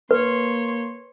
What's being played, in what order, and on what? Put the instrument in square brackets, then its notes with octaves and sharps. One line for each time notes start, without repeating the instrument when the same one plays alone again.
[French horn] A#3 [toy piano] B4 [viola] C#5 C6